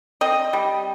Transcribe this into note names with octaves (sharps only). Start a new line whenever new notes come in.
C4 D#5
G3